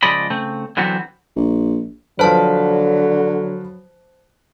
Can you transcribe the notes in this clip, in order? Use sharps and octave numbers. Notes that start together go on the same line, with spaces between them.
C#2 F3 G#3 D5 D#5 B5
C#3 A3 C4
D3 E3 F#3 B3 C4
A#1
D3 F3 F#3 B4 C5 A5